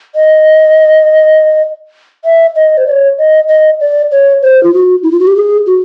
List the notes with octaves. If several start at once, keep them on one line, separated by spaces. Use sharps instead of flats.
D#5
E5
D#5
C5
D5
C#5
D#5
D#5
D5
C#5
C5
F4
F#4
E4
F4
F#4
G4
G#4
F#4